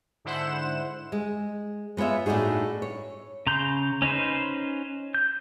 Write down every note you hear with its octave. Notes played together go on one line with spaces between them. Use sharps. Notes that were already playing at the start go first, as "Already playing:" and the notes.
G#2 D3 E4 C5 F#5 E7
G#3
G#3 B3 F4 C#5 E5
A2 D4 D#4 F#4 G#4
C#5
C#3 A#5 C6 G6
C#4 D#4 B4 C5
G6